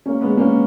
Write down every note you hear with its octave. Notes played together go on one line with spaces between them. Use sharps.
A#3 C#4
G#3 B3
A#3 C#4